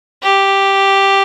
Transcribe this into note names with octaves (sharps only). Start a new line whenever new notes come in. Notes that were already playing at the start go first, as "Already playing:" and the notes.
G4